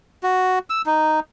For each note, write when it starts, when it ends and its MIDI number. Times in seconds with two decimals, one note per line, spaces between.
0.23 0.59 66
0.70 0.82 88
0.86 1.20 63